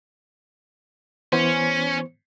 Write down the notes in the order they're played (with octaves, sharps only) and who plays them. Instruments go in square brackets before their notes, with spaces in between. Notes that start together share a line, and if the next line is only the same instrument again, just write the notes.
[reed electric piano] E3 B3 C5 [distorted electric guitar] C#4